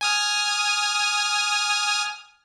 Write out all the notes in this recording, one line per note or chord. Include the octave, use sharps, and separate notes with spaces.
G#5 D#6 F6